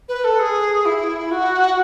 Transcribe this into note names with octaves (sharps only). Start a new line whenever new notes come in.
B4
A4
G#4
E4
F#4